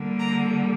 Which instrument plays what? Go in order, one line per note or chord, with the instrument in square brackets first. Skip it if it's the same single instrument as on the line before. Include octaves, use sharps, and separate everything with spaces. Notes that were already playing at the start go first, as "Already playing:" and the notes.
Already playing: [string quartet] D3 G3 A#3
A#5